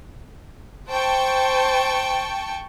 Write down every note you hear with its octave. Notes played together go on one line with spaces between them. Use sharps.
C5 G5 A5 C#6